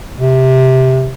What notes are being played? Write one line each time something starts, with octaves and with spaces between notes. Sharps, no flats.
C3